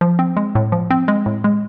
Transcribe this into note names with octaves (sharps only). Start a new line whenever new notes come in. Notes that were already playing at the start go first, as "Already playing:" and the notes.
F3
C4
G#3
A2
F3
C4
G#3
A2
G#3